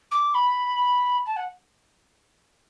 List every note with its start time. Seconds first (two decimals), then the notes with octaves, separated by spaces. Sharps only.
0.11 D6
0.34 B5
1.26 A5
1.36 F#5